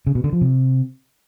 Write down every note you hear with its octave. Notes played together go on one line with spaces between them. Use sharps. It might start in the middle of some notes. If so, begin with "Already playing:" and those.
C#3
B2
D3
F3
C3